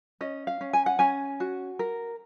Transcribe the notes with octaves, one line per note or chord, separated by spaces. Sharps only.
C#4 D#5
F5
C#4
G#5
F#5
C#4 G#5
F#4
A#4